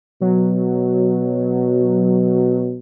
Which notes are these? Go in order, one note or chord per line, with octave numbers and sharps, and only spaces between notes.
B2 F#3